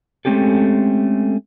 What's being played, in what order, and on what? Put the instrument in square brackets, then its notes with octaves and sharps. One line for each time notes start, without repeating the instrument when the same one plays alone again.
[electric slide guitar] G#3 A3 C4 C#4 G4 A4